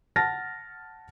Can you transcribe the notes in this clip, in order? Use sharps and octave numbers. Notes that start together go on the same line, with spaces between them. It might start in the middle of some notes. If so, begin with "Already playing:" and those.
F#5 A5 F6 A6 A#6